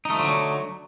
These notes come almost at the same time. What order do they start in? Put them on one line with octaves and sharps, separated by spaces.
D#4 A3 F3 D3 F#3